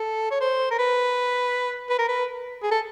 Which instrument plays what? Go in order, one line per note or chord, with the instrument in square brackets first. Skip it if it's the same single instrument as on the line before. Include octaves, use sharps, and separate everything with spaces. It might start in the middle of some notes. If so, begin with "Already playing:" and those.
Already playing: [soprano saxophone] A4
C#5
C5
A#4
B4
B4
A#4
B4
G#4
A4